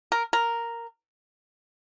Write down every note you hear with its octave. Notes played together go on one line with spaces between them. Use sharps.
A#4
A#4